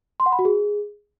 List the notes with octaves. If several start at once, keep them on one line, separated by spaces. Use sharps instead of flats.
C6
F#5
B5
F#4
G#4